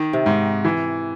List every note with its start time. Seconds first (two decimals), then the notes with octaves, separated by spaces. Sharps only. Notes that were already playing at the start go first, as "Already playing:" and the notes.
Already playing: D#3
0.13 C3
0.26 G#2
0.65 E3